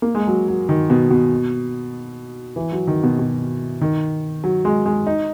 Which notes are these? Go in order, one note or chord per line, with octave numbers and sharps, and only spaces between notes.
A#3
G#3
F#3
F#3
D#3
B2
B2
E3
F#3
D#3
B2
B2
D#3
F#3
G#3
G#3
D#4